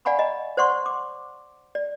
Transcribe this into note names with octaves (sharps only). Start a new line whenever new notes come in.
D5 F5 F#5 G#5 B5 C#6
D#5 A#5
C5 D5 F#5 C6 C#6
D6
D5